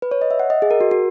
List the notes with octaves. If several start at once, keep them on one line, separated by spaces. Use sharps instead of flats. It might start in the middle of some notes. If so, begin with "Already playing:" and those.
B4
C#5
D#5
E5
F#5
D#5
G#4
A#4
F#4
F#4